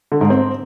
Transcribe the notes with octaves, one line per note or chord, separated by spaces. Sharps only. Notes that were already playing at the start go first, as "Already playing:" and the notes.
D3
G#2
C4